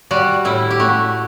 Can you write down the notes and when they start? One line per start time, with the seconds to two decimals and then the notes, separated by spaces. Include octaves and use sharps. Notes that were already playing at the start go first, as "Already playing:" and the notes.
0.11 G3 F#4
0.45 A2 E4
0.71 G4
0.79 A3 F#4